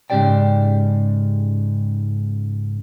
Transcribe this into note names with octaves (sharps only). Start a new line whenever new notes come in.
G#2 C#3 A#3 G4 D5 G5